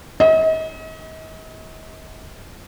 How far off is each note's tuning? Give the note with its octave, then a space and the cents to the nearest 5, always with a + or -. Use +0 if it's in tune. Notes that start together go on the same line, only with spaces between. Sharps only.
D#5 +40